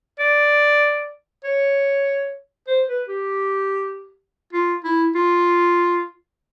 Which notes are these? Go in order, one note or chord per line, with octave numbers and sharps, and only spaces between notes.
D5
C#5
C5
B4
G4
F4
E4
F4